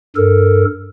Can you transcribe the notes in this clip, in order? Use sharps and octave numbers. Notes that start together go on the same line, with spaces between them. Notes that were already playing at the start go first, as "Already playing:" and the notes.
G2 A4 A#4